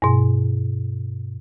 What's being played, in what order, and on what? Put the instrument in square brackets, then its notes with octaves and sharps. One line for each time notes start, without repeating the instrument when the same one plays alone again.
[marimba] G2 B2